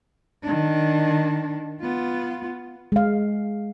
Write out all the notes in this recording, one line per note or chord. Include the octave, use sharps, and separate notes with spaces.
D#3 D4
B3 F4
G#3 F5